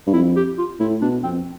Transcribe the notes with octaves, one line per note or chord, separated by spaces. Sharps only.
G2
F2 E4
G4
F4
A2 E4
B2 D4
F2 C4